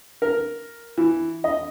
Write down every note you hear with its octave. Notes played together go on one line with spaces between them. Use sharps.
A#4
E3
D#5